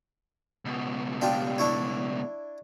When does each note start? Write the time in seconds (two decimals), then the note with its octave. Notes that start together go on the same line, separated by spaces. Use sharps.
0.65 C#2 B2
1.21 D4 F4 G4
1.58 D4 E4 C#5